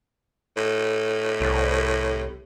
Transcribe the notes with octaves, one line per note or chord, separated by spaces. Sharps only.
A2
C2